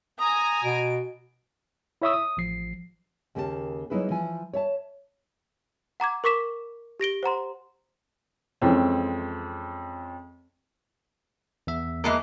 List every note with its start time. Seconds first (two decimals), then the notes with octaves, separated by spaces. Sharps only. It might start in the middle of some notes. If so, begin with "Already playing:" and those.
0.19 G#5 A#5 D#6
0.64 B2 D7
2.02 E4 C#5 E5 C#6 D#6 E6
2.13 D#6
2.37 A1 F3 C7
3.35 D#2 C#3 A#3 G4 C5 A5
3.90 F#3 A#3 D#4 E4 G#4 B4
4.10 E3 F3 G#5
4.53 C#5 E5 A5
6.00 F#5 A#5 D6 G#6
6.24 A#4 C#6 D6 B6 E7
7.00 G4 A#6 D7 G7
7.23 C5 F#5 A#5 C6
8.62 F2 E3 G#3 C4 C#4
11.67 E2 E5
12.04 E3 G#3 A#3